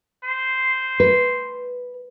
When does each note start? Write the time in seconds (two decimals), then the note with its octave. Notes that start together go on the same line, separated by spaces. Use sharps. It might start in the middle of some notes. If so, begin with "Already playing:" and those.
0.24 C5
1.00 B4